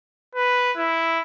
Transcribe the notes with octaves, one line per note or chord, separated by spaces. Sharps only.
B4
E4